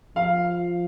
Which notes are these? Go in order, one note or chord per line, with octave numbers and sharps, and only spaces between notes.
F3 F5